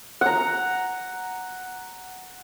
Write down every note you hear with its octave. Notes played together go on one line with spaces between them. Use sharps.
F#5 A#5